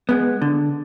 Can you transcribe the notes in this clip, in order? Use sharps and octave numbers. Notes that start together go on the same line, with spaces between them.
G#3 B3
D3